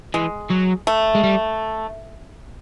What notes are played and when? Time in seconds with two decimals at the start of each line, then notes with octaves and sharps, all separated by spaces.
0.14 E3 G#3
0.50 F#3
0.87 A3
1.15 G#3
1.24 G3